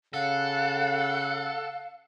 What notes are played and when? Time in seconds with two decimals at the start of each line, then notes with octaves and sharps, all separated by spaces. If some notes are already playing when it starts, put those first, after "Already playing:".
0.14 C#3 A4 F5 F#5